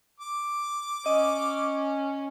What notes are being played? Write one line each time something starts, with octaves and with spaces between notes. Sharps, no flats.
D6
C#4 D#5